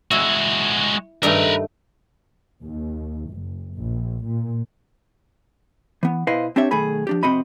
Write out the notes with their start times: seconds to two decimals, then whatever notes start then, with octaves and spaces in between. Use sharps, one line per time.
0.11 G#3 E4 F#4
1.23 G2 D#3 A3 A#4 B4
2.61 D#2
3.31 F#1
3.75 A#1
4.23 A#2
6.03 E3 B3
6.27 B2 E4 B4 C5 D#5 F5
6.56 C4 D4 G4 C#5 E5
6.71 B1 D#3 A3 G#4 B5
7.07 F3 D4 G4
7.23 F2 C3 C4 F#4 D#5 B5